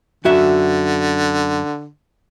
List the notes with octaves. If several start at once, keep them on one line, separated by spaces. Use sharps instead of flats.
F#2 D3 F#4 E5